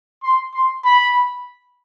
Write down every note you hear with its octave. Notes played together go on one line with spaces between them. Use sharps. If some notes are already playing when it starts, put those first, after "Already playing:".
C6
C6
B5